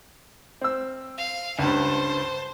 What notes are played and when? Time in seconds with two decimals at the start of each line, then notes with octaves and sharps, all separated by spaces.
0.61 C4 E6
1.17 F5
1.59 C#2 G2 C5 A5